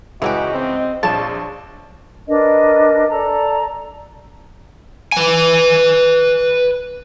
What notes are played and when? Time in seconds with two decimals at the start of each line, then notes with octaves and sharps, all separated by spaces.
0.22 C#2 E3 C#4 F#4 G4 D#5
0.53 C4
1.03 A#1 F3 D4 C#5 A5 E7
2.28 D4 A#4 B4 D#5
3.10 A4 D5 A5 A#5
5.12 B4 G#5